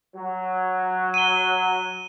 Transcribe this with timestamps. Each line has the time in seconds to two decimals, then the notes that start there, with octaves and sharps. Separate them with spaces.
0.16 F#3
1.14 D#7 G7